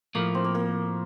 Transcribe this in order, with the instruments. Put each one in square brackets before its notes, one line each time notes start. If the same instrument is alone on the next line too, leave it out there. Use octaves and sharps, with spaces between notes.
[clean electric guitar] A2 F3 A3 [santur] A#3
[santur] C4
A#3
A#3